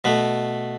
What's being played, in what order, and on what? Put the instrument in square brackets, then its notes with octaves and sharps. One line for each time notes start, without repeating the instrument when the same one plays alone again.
[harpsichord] B2 A3 B3